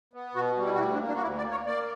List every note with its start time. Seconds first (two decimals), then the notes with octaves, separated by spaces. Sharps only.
0.14 B3
0.35 B2 F#4
0.57 G3
0.65 E4
0.74 F#4
0.78 D2 E4
0.93 D4
1.01 A#3
1.08 D4
1.16 F#4
1.22 D2 E4
1.37 D5
1.44 A#3
1.51 C#5
1.66 A#3 D5